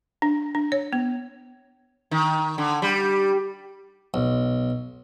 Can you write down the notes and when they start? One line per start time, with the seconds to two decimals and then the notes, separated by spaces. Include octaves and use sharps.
0.22 D4
0.55 D4
0.72 C#5
0.93 B3
2.11 D#3
2.58 D3
2.82 G3
4.14 B1